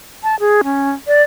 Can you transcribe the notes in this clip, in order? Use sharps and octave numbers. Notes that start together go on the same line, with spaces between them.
A5
G#4
C#4
D5